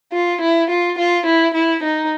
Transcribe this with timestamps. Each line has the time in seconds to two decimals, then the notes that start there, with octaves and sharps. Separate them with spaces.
0.13 F4
0.41 E4
0.70 F4
0.98 F4
1.26 E4
1.54 E4
1.83 D#4